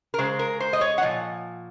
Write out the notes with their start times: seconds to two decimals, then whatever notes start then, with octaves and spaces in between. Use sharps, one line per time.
0.14 A#4
0.18 C#3 G#3 C5
0.39 A#4
0.60 C5
0.73 D#5
0.81 C#5
0.98 F#5
1.03 A#2 F3